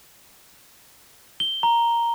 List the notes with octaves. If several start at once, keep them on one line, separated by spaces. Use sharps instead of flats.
G7
A#5